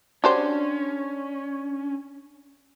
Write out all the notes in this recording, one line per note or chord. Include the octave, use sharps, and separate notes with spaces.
C#4 D4 F#4 G4 C5